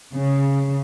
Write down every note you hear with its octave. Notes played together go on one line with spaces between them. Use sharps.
C#3